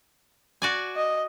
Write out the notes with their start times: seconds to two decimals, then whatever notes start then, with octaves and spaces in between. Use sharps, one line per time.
0.62 F#4 D5 G#5
0.96 D#5